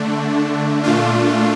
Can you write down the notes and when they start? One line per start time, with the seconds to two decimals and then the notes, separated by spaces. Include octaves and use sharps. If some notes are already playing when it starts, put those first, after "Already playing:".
Already playing: D3 A3 D4
0.84 A#2 A3 D4 F4